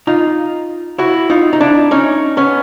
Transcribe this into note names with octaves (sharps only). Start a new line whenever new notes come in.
D#4 F4
E4 F#4
D#4 F4
D#4
D4 E4
C#4 D#4
B3 C#4